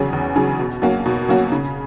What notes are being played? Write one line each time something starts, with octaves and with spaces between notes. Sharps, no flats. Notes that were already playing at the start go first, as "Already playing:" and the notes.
Already playing: E2 C#3 F#3 C#4 G#4
E2
C#3 F#3 C#4 G#4
B2
F#3 A#3 C#4 F#4
B2
F#3 A#3 C#4 F#4
C#3